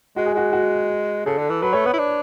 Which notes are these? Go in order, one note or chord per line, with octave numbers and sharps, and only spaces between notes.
G#3 F#4
G#4
G#3 F#4
F#4
C#3 A4
D3
E3
F#3 B4
A3 C#5
B3 B4
E4
D4